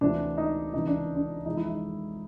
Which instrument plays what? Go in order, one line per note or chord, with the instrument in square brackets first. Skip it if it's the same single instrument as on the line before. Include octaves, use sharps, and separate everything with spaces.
[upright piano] D2 C3 E3 D4
D#4
C#2 C3 E3 D#4
D4
D4
F2 C3 E3 G#3 D#4
E4
D#4